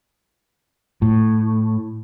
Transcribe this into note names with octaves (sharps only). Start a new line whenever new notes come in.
A2